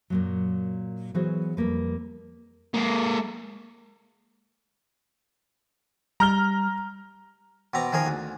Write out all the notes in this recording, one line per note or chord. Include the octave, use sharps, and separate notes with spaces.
F#2 A#2 F#3
E3 F#3 B3 F#4 G#4 C5
F2 G3 A#3 B4
G#3 A#3
G3 A#5 F6 G7
B2 C4 A#5 D6
D#3 F3 G#4 A#4
D2